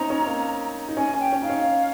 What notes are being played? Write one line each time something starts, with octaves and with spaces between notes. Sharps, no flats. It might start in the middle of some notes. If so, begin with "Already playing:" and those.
Already playing: C4 C#4 D#4 A#5
C#4
A#3
D#4
C#4 G#5
C#4
G5
C#4
D#4 F5
C#4